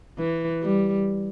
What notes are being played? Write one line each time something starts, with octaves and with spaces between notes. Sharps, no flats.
E3
G3